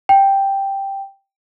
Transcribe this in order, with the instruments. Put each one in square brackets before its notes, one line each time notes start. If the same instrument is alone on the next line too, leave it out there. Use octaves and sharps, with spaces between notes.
[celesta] G5